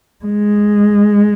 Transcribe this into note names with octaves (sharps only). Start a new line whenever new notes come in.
G#3